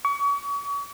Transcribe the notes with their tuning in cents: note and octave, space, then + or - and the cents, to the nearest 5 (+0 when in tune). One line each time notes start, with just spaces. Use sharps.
C#6 +40